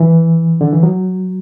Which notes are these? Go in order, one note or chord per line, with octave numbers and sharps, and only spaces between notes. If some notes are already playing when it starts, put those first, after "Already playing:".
Already playing: E3
D3
E3
F#3